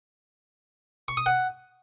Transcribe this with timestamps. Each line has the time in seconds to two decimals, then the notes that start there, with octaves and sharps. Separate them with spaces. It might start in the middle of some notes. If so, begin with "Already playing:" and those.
1.08 C#6
1.17 D#6
1.26 F#5